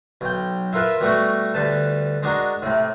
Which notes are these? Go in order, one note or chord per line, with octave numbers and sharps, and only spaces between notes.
B1 G5
E4 F4 A#4 B4 E5
B2 G3 A3 F#4
D2 G3 B4 A5
G#3 D4 F#4 A#4
A2 C3